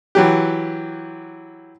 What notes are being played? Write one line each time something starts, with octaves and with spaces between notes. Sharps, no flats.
E3 F#3 G4